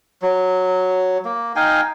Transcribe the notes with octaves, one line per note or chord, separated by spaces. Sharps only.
F#3
A#3
D#4 F5 G5 G#5